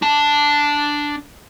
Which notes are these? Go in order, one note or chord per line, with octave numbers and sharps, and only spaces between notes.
D4 A5